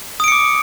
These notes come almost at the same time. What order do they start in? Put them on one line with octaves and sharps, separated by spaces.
D#6 D7 C#7 D6